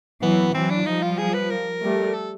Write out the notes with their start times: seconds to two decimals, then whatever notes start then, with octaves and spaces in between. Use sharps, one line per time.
0.22 E3 F#3 B3
0.54 E3 F#3 C4
0.70 D4
0.86 F3 G3 D#4
1.02 F4
1.18 G#4
1.34 B4
1.51 A#4
1.82 G3 A3
2.14 A4